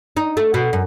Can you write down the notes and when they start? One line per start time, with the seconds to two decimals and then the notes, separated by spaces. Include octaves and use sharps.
0.17 D#4
0.37 A3
0.54 B2
0.73 F#2